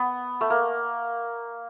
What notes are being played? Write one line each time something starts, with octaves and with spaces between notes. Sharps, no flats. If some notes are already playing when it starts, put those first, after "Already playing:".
Already playing: B3
A3
A#3